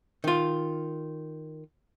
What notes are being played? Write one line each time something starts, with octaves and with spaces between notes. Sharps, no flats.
D#3 F4